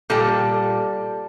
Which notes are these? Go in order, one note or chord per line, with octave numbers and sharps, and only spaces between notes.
A#2 G3 A4